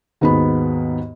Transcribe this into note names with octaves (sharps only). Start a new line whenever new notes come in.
D#2 G#2 B3 F#4 B5